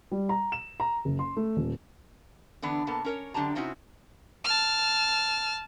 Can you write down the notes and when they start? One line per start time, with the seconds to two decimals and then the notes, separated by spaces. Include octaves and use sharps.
0.11 G3
0.29 A#5
0.52 E7
0.80 A#5
1.05 F#1
1.19 C6
1.37 A3
1.57 D#1
2.62 D3 E3 B3 D4
2.87 B2 A#3 B3 A4 A5
3.05 C#4 A#4 C#5
3.34 F#2 D3 D4 G4 A5 A#5
3.55 C3 C4 C#4 D#4 E4 F#4
4.44 A5 F6